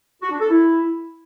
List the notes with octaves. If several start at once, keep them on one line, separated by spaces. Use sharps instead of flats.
F#4
D4
A4
E4